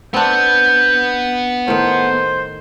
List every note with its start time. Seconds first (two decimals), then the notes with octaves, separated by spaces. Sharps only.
0.14 B3 C4 D4 B4 G6
1.68 A2 D#3 C5